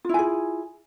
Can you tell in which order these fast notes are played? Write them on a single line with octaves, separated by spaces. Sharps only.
F4 E4 G#5 G#4